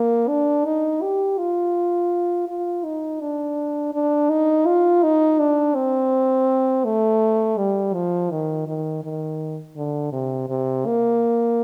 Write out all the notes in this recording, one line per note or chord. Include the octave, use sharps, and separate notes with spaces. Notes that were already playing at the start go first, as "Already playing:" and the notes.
Already playing: A#3
D4
D#4
G4
F4
F4
D#4
D4
D4
D#4
F4
D#4
D4
C4
A3
G3
F3
D#3
D#3
D#3
D3
C3
C3
A#3